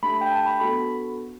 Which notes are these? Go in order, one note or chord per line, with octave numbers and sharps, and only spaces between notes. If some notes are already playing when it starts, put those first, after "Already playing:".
A3 D4 G4 B5
G5
A5
B5
B3 D4 F#4 A4 B5